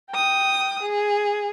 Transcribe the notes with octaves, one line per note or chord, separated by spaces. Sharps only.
G5 D#6
G#4